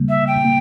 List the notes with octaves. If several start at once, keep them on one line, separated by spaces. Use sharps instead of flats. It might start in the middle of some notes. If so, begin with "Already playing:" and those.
Already playing: C#3 G3 A#3
E5
G5
A#3